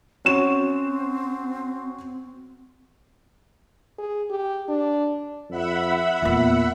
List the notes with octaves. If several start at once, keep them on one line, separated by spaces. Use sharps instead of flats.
C4 C#4 F#4 E7
G#4
G4
D4
F2 E5 F#5 B5
E2 A#2 B3